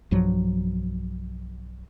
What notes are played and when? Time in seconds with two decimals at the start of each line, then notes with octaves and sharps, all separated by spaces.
0.11 B1 G2 F3 F#3